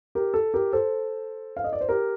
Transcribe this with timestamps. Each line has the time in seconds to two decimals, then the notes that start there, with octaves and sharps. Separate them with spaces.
0.15 G4 A#4
0.34 A4
0.54 G4 A#4
0.73 A4 C5
1.57 F5
1.64 D#5
1.73 D5
1.81 C5
1.89 G4 A#4